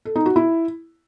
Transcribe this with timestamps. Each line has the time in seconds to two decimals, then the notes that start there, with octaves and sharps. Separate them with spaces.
0.05 A4
0.16 D#4
0.26 F#4
0.36 E4